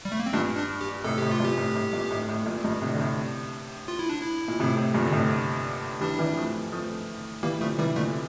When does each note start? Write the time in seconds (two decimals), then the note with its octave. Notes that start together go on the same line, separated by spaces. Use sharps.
0.05 G3
0.12 A3
0.20 A#3
0.26 C4
0.33 G2 A#2 D4
0.57 D4
0.81 G4
1.04 A2 C3 A4
1.18 A2 C3 G4
1.31 F4
1.40 G2 A#2 G4
1.58 A2
1.75 A2
1.93 G2 A#2
2.11 A2
2.28 A2
2.46 G2 A#2
2.64 G2 A#2
2.82 A2 C3
2.94 D3
2.99 A2 C3
3.88 F4
3.99 E4
4.09 D4
4.21 E4
4.48 A#2
4.60 A2 C3
4.77 A2
4.94 G2 A#2
5.06 D3
5.12 A2 C3
6.01 E3 G3 D4
6.19 E3 G3
6.37 F3 A3
6.72 F3 A3
7.43 E3 G3 A#3
7.61 D3 F3 A3
7.78 C3 E3 G3
7.96 A#2 D3 A3